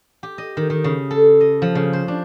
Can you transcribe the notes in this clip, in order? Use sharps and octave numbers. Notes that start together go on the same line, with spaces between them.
G4
D#5
D#3
D#3
C#3
A4
D#5
F3
C#3
C5
D4